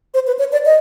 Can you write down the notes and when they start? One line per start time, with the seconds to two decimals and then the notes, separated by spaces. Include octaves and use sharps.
0.14 C5
0.27 B4
0.39 C#5
0.52 D5
0.66 D#5